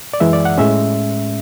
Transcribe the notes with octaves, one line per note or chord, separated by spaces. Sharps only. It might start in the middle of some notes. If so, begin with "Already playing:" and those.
D5
F#2 E3 G#3 E5
D5
F#5
A2 G#3 C#4 E5